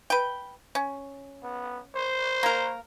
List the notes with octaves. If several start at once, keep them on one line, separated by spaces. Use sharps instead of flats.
B4 G5
C#4
B3
C5
A#3 A#4